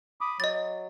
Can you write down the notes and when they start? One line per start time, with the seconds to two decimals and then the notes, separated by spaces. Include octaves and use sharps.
0.21 B5 D6 D#6
0.40 F#3 D#5 A6